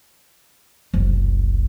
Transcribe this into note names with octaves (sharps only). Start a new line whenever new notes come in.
F#1 C2